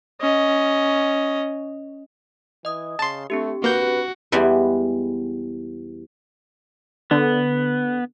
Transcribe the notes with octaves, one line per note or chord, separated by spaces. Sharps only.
C#4 D#5
E3 D#5 D#6
C#3 A5 C6
A3 C4 D4 G4
A#3 F#4 B4 G6
E2 E3 G3 G#3 B3 G#5
D3 B3